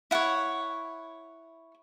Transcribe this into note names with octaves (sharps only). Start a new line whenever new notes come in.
E4 C#5 F#5